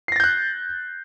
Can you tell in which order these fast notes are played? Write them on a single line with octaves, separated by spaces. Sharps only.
C7 A#6 A6 G6 F#6